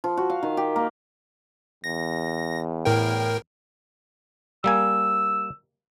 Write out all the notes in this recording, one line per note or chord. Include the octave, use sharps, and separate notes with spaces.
F3
F#4
F5
D#3
G4
A#3
E2 A#6
A2 A#4 G5
G3 A#3 G#5 E6